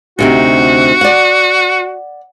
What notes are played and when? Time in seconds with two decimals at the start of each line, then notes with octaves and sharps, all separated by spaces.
0.19 D2 C3 D#4 F#4
1.01 D5 F#5